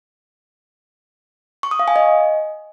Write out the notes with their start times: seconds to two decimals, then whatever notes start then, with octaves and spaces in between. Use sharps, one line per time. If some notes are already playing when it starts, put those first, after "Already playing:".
1.63 C#6
1.71 D#6
1.79 F5
1.88 G#5
1.96 D#5